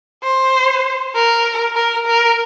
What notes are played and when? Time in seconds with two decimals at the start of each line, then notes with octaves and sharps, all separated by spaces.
0.23 C5
1.15 A#4
1.75 A#4
2.07 A#4